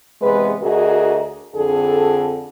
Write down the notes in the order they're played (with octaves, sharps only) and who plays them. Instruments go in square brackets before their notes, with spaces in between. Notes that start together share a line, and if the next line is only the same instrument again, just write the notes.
[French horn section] E2 C3 G#3 B4
D2 F#4 G#4 A#4 D#5
F2 D3 G#4 A4